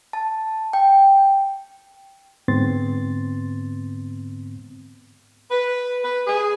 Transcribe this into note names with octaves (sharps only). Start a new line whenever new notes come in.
A5
G5
G#2 D3 B3 C4 C6 A6
B4
B4
G#4